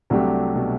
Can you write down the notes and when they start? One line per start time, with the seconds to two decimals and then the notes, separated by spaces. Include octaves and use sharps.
0.10 C2 C3 F#3 A3 D4 G4
0.55 B2